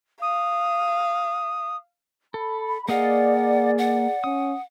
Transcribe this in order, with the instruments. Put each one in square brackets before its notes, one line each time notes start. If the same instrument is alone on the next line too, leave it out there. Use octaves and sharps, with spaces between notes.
[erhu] F5 [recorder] D#6
[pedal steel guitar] A4 [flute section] B5
[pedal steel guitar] A#3 D#5 F5 [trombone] G#4 [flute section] D5 [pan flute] F#5
[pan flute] F#5
[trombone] C#4 [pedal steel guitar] D#6